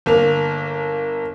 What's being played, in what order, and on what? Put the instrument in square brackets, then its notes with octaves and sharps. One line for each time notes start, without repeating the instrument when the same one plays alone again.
[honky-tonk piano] G1 A#3 F7